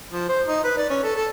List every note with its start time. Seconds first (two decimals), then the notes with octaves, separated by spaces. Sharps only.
0.12 F3
0.29 C5
0.47 D#4
0.64 B4
0.77 D5
0.90 C#4
1.04 A4
1.16 A4